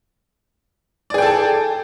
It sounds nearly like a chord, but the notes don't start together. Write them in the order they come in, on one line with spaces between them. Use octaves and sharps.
D5 G#4 G5 A4 A5